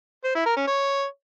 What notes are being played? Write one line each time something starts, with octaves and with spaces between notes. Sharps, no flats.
C5
E4
A#4
C#4
C#5